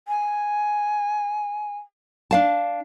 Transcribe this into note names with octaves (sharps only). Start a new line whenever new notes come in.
G#5
D4 F5 A5